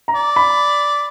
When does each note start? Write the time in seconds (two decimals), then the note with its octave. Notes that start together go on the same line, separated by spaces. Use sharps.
0.08 A#5
0.15 D5
0.36 B5